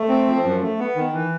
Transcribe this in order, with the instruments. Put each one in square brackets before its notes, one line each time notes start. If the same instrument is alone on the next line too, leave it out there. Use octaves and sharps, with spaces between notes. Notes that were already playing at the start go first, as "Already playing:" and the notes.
Already playing: [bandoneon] A3
C4
F3
F#2
A3
B3
D#3
E3